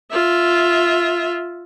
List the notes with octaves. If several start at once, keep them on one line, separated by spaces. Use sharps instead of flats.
F4 E5